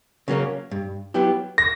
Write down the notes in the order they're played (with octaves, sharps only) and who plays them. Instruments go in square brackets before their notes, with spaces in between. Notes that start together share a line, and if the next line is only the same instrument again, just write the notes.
[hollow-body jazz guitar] C#3 F#3 A#3 C#4
G2
F#3 B3 E4 G4
[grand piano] A#6